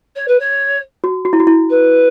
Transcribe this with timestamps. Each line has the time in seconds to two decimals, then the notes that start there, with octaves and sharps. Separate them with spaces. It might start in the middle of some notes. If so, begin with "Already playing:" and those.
0.15 C#5
0.28 B4
0.39 C#5
1.04 F#4
1.25 F#4
1.33 E4
1.40 F#4
1.47 E4
1.70 B4